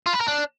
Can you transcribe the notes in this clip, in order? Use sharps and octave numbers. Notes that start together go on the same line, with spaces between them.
F4
B4
A#4
D4